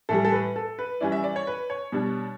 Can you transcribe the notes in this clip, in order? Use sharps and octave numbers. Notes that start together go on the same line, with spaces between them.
A2 E3 G3 A4
A4
B4
A4
B4
E3 G3 C#4 E4 D5
E5
D5
C#5
B4
C#5
B2 G3 D4